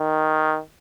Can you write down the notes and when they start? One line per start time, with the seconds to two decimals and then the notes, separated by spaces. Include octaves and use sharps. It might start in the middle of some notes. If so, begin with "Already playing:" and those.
Already playing: D#3